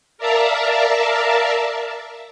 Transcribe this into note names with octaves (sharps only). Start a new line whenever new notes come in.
A#4 D5 E5 F5 A5 A#5